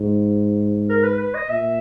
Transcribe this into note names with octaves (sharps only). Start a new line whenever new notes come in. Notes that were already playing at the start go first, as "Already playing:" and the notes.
Already playing: G#2
A#4
B4
B4
D#5
A#2 E5